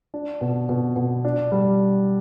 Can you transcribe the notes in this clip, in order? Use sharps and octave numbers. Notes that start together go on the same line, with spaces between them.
D4
B2
B2
B2
D4
G3